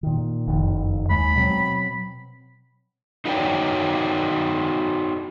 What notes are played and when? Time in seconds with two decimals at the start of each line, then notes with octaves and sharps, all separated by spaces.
0.03 A#2 D#3
0.47 F#1 F2 D#3
1.10 D#2 G#3 B5
1.36 B2 F#3 C4
3.25 D#4 F#4 B4 C#5 D5 G5